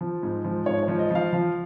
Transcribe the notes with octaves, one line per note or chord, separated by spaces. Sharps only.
F3
G#2
F3
G#2 C#5
C#5
F3
D#5
F3 F5
F3